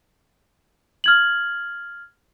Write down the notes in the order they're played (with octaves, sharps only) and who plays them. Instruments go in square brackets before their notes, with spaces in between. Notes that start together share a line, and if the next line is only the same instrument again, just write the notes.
[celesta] F6 G#6 F#7